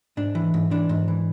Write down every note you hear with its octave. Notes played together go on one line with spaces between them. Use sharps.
G#2 D4
E3
G#2
E3 D4
G#2
E3